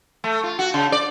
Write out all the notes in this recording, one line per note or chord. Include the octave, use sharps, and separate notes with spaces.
A3
F4
F#4
C#3
D5